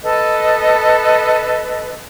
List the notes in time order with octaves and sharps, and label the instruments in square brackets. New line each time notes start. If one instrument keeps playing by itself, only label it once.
[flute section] A4 B4 D#5